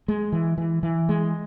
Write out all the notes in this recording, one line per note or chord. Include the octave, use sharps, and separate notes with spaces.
G#3
E3
E3
E3
G#3